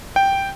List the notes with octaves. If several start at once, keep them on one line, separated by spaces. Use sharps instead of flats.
G5